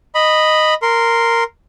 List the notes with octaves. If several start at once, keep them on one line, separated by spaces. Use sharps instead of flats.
D#5 B5
A#4 C6